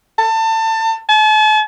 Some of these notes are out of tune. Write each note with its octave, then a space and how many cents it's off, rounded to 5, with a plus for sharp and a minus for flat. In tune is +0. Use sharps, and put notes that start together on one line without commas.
A5 +25
A5 -40